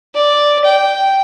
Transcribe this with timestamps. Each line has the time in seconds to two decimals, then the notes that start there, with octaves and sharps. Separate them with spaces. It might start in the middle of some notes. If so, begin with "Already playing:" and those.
0.14 D5
0.64 G5